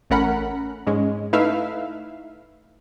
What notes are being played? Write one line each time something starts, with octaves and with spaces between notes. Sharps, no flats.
A1 A3 C#4 A#4 F#5 B5
G#2 G#3 C#4
A3 D#4 E4 B4 E5 F5